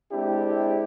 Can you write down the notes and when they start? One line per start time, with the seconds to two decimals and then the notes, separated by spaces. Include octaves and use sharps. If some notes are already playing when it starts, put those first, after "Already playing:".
0.12 G#3 C4 D4 E4 G4